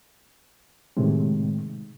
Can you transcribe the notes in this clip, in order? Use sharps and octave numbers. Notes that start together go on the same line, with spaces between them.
A2 C3 D#3 G#3